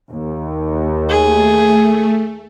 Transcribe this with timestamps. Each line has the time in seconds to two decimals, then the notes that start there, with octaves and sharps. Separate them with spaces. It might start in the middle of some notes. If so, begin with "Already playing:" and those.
0.11 D#2
1.09 A3 G#4